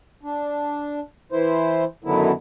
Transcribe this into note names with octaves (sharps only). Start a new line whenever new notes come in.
D4
E3 E4 C5
F#2 D3 D#3 F#3 B3 E4